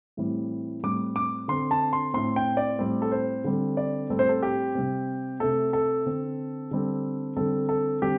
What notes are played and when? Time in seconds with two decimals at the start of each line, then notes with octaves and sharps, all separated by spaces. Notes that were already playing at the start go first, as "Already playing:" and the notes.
0.17 A2 E3 G3 C4
0.83 A2 G3 C4 D6
1.16 D6
1.48 D3 C4 C6
1.71 A5
1.93 C6
2.14 A2 A3 C4 C6
2.36 G5
2.57 D5
2.79 A2 G3 C4
3.02 A4
3.12 C5
3.44 D3 G3 C4
3.77 D5
4.10 A2 G3 C4 A4
4.19 C5
4.29 A4
4.43 G4
4.75 C3 G3 C4
5.40 C3 A3 C4 A4
5.73 A4
6.06 D3 C4
6.71 D3 G3 C4
7.37 D3 G3 C4 A4
7.69 A4
8.02 D3 G3 C4 G4